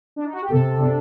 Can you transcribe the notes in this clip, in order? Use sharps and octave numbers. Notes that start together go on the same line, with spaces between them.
D4
D#4
F#4
G4
C3 A4
D4